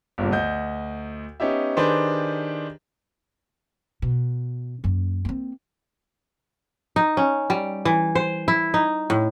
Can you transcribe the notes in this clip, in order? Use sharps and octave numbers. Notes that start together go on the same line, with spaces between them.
G1 G2 A#2 C#3
D2 D#5 G6
B3 C#4 D#4 G4 E5
D#3 D4 G4 G#4 B4 C5
B2
F#2 A#3
A#3 C4
D#4
C#4
G3
E3
C5
E4
D#4
A2